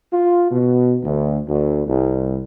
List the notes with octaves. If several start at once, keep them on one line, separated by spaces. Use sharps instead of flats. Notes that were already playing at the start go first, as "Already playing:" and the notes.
F4
B2
D2
D2
C2